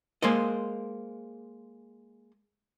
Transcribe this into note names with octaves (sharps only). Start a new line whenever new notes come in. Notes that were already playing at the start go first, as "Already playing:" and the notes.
G#3 A#3 C5 D#5